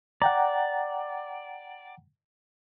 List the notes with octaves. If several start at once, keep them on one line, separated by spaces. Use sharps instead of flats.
D5 F#5 G5 A#5